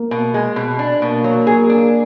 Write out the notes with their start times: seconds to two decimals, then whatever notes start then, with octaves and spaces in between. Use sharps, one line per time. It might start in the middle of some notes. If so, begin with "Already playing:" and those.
Already playing: A#3
0.11 B2
0.34 G#3
0.56 B2
0.79 D4
1.02 B2 A#3
1.24 F#3
1.47 G#4
1.69 D4